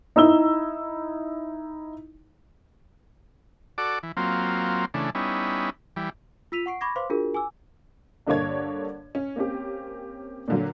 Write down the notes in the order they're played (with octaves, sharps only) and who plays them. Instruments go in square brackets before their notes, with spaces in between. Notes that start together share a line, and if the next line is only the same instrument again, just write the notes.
[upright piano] D#4 E4 E6 G7
[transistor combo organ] F#4 A4 D5 D6
E3
F#3 A#3 C4 F4
C#3 E3 A3 D4
G3 B3 C#4 D#4 E4
E3 G3
[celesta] F4 E6 B6 D#7 F7
F#5 C#6 C7 D7
B5 C#6 D6 G#6 A#6
B4 C5 F5 C6 D6
D4 F4 F#4 G#4 A#4
G#5 D6 E6
[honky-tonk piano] G2 D3 A#3 D4 C#5 G#6
C#4
A#3 C4 C#4 G4
A#2 D3 F#3